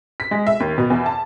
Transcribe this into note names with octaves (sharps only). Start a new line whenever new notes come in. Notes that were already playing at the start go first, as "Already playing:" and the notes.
B6
G#3
E5
D#2
B2
E2
A5